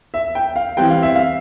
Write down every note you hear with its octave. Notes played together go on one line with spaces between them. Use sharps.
E5
G5
F5
E3 G3 C4 G5
F5
E5
F5